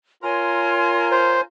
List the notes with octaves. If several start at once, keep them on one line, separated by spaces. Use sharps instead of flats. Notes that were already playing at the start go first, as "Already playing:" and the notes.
F4 A#4 C#5 G#5 C6
C5